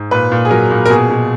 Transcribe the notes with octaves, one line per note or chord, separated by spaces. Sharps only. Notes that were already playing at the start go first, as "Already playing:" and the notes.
Already playing: G#2
A#2 B4
A#2
G#4
F#3 A#4
A#2
A#4
B2 G#4
B2